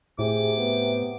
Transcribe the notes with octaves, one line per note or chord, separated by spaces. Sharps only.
A2 C3 G#4 D6
B3